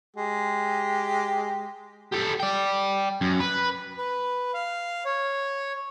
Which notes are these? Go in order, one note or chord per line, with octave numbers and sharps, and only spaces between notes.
G#3 G4
G4 A4
D5 G5
F#2
B4
B4
F5
C#5